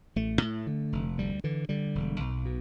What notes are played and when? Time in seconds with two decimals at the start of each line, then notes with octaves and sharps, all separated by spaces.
0.16 A1 A3
0.42 A2
0.67 D3
0.92 F1
1.18 D2 G3
1.44 D3 E3
1.69 D3 G3
1.95 E1
2.20 B1
2.45 B2